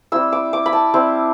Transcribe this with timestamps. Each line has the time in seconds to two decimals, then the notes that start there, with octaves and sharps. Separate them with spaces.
0.12 G3 C4 E4 E6
0.32 D6
0.53 D6
0.66 B5
0.73 A5
0.94 G3 C4 E4